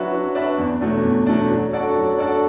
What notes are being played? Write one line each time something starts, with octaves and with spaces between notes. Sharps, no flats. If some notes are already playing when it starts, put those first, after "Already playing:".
Already playing: F#3 D4 F#4 B4 E5
F#3
D4 F#4 B4 E5
E2
B2 F#3 A3 D4
E2
B2 F#3 A3 D4
F#3
D4 F#4 A4 D5
F#3
D4 F#4 A4 D5